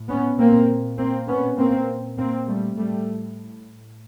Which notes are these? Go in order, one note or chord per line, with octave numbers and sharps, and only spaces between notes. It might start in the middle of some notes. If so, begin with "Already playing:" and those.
Already playing: A2
B3 C#4
A#2 A#3 C4
A#3 C4
B3 C#4
A#2 A#3 C4
A#3 C4
G3 A3
A2 G3 A3